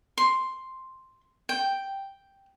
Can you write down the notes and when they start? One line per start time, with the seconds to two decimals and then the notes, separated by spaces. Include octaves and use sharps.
0.18 C6
1.49 G5